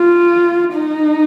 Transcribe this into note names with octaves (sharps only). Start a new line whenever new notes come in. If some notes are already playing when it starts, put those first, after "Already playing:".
Already playing: F4
D#4